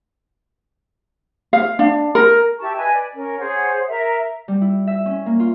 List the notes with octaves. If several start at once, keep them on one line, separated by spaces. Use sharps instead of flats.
F5
D4
A#4
E4 G4 A5 C#6
B4 D#5 G#5
D5
C#4 A#4
G#4 C5 C#5 F#5
A#4 E5 A#5
G3
E4
E5
C#4
A#3
F4